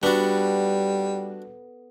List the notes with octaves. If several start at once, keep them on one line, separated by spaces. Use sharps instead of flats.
G3 B3 D4 F#4 A4